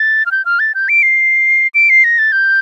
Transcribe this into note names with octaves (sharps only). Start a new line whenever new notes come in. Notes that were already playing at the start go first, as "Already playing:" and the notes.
Already playing: A6
F6
G6
F6
A6
G6
D7
C7
D7
C7
A#6
A6
G6